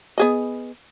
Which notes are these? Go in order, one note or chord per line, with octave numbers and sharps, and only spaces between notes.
B3 G#4 D#5